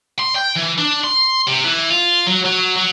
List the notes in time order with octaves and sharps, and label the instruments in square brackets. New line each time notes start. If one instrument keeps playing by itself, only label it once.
[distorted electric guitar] C6
G5
E3
D4
C6
C3
E3
F4
F#3
F#3
F#3